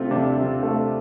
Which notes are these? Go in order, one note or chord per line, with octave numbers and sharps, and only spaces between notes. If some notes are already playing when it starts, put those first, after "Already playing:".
Already playing: C3 A3 C4 F4
C3 D4
C3
A3